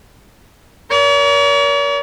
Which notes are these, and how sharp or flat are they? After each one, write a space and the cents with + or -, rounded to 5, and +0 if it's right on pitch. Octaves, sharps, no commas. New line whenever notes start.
A#4 +20 C#5 +45